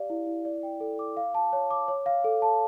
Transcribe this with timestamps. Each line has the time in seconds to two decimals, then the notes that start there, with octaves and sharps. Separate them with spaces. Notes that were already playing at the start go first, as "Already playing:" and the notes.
Already playing: G4 D5 F5
0.10 E4
0.27 E4
0.45 D5
0.63 G5
0.80 A4
0.99 D6
1.17 F5
1.35 A5
1.53 C#5
1.71 D6
1.88 C#5
2.06 F5
2.24 A4
2.42 A5